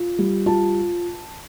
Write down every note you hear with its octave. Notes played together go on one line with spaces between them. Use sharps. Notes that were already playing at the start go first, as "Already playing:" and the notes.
Already playing: F4
G3
F4 A5